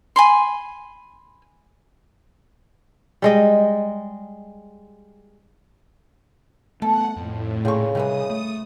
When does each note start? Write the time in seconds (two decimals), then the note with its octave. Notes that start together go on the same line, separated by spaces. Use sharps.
0.16 G#5 B5 C6
3.22 G3 G#3 D#5
6.82 A3 B3 A4 F#5
7.16 F2 A2
7.65 A#2 C#3 C4 C#6
7.95 C3 D#3 E3 G3 G#3 D#6
8.30 A3